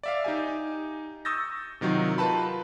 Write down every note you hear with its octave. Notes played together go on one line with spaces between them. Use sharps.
D5 E5 F5
D#4 G4 G#5
C#6 D#6 E6 G6 A6 A#6
C3 D#3 F#3 D#4 F4
F4 A#4 B4 A5 B5